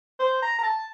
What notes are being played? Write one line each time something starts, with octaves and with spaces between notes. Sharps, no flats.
C5
A#5
A#5
A5